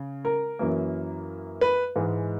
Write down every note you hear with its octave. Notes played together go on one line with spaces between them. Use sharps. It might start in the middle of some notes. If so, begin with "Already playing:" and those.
Already playing: C#3
A#4
F#2 E3 A#3
B4
G#2 E3 G#3